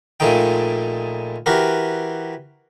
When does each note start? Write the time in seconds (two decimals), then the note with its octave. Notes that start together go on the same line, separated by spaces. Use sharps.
0.20 A#1 A#2 G#3 A3 D#4 G5
1.46 E3 F#4 G4 A#4